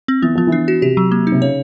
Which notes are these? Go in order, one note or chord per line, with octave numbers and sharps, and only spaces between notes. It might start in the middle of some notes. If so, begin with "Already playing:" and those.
C4
E3 B3
F3 B3
E3
D4
F#4
C3 G4
F#3
A#3
D#4
C3
C#3 C#5